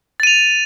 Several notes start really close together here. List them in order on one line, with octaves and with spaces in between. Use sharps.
A6 D#7 F7